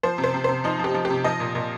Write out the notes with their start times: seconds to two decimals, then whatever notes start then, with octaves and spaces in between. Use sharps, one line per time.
0.03 F3 C5
0.18 C3
0.24 C5
0.34 C3
0.44 C3 C5
0.64 F3 D#4
0.79 F3 G4
0.94 F3
1.05 G4
1.10 C3
1.24 F3 D#5
1.40 A#2
1.55 A#2